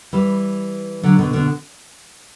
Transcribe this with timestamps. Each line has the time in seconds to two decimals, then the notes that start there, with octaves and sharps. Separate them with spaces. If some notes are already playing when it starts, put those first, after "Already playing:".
0.13 E3 G3
1.03 D3 F#3
1.19 B2 D3
1.33 B2 D3